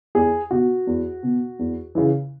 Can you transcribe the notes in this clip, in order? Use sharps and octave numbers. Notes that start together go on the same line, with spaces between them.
E2 G#4
B2 F#4
E2
B2
E2
C#3 E3